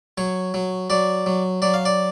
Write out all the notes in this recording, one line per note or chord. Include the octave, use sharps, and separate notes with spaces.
F#3 C#5
F#3
F#3 D5
F#3
F#3 D5
F5
D5